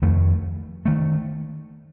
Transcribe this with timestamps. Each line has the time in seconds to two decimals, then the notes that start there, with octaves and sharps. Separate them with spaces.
0.02 F2 D#3 A3
0.85 D#3 A3